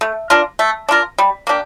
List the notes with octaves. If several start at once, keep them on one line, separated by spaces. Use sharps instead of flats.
A3
D4 F4 A#4
A3
D4 F4 A#4
G3
A#3 D4 G4